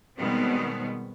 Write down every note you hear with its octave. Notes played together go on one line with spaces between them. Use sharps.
B2 D#3 G3 G#3 B3 C4